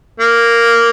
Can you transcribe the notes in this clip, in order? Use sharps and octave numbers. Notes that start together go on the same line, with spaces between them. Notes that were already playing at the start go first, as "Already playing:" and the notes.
A#3